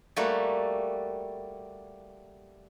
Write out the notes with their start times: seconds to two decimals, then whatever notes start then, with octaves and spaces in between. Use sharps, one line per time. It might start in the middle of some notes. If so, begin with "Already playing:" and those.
0.16 G3 A3 A#3 F#4